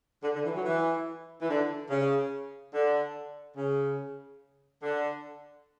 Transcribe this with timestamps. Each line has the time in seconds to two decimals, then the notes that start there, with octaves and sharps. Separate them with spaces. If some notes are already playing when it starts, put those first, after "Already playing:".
0.23 D3
0.34 D3
0.44 E3
0.55 F#3
0.65 E3
1.41 E3
1.49 D3
1.90 C#3
2.74 D3
3.57 C#3
4.82 D3